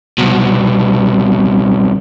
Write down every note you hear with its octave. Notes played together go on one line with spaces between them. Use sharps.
C2 B2